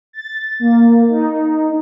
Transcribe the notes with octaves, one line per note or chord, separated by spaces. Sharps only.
A6
A#3
D#4